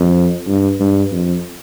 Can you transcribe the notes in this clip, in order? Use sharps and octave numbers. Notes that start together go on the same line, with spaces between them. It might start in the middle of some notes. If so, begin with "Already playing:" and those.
Already playing: F2
G2
G2
F2